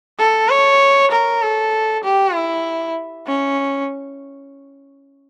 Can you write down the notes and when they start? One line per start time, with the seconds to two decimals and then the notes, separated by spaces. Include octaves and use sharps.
0.19 A4
0.49 C#5
1.11 A#4
1.42 A4
2.04 G4
2.35 E4
3.27 C#4